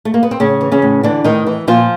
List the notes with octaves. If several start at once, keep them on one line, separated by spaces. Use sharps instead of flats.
A3
A#3
B3
C4
A2 C#3 C#4
E3
C#3 C#4
A2
D3 E3 D4
A2 D#3 D#4
E3
A#2 F3 F4